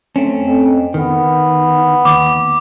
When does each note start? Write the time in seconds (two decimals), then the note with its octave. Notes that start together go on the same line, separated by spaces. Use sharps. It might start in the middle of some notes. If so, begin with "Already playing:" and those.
0.16 A3 C4 C#4
0.40 F2
0.94 D#3 B3
2.05 D#2 D6